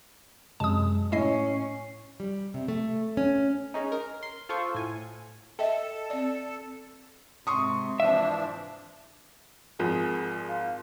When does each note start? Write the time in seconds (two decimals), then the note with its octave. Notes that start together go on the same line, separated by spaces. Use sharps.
0.60 F#2 C3 G#3 A5 D#6
1.12 A2 A3 C#4 E4 D#5 C7
2.20 G3
2.54 C3
2.68 A3
3.17 C#4
3.74 G#3 C#4 D#4
3.92 A#4
4.23 C6
4.49 F4 A4 C5 C#6
4.75 A2 G#5
5.59 A4 D#5 E5 G5
6.10 C4 D5
7.47 G#2 C3 C6 C#6 D#6
8.00 E3 F3 D4 E5
9.79 G#1 F3 G#4
10.49 F4